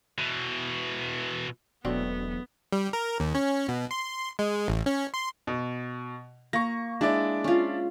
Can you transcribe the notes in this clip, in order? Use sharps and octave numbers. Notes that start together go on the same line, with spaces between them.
B2 E3
E1 B2 F#3 A3 B3 C4 D4 F#4
G3
A#4
D#2
C#4
B2
C6
G#3
A1
C#4
C6
B2
A#3 C#6 A#6
G#3 D4 E4 D5
C#4 F4